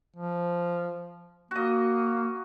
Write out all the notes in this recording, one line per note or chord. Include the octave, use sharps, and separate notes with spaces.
F3
A#3 F#4 D#5